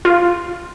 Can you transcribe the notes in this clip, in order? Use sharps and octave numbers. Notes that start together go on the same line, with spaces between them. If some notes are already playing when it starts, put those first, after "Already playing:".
F4